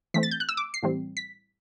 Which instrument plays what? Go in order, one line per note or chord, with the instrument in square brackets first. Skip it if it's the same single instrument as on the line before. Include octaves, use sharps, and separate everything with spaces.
[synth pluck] E3 A3 C4 B6
A6
G6
F#6
E6
D6
C7
A2 E3 G3 C4
B6